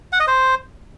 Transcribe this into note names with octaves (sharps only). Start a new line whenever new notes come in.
F#5
D#5
C5